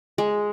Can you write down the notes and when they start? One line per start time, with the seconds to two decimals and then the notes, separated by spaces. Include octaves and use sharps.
0.18 G#3